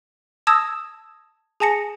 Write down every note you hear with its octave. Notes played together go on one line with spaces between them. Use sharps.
A5 D#6 E6 G#6 A#6 E7
G#4 G#5 A5 A#6 C#7